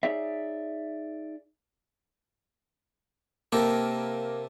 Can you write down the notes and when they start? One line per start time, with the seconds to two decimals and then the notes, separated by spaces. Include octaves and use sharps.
0.03 D#4 G#4 C#5 D5 E5
3.52 C3 A#3 G4 A4 A#4